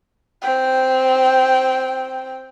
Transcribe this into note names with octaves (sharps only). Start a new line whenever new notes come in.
C4 G5